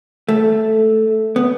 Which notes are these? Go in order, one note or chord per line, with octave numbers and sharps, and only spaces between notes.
A3
B3